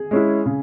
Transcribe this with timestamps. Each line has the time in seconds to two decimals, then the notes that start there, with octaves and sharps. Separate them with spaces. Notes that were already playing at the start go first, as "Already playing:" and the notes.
Already playing: G#4
0.11 G#3 C#4 E4
0.46 C#3